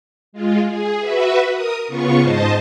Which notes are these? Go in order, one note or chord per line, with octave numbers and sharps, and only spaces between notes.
G#3 F4
G#4
F#4 B4 E5
A#4 D#6
C#3 B3 F4 C#6
G#2 C5 D#5 A5